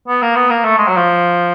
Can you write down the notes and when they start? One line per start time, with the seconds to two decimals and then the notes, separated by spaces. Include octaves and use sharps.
0.08 B3
0.22 A#3
0.36 B3
0.50 A#3
0.64 A3
0.78 G#3
0.88 F#3
0.97 F3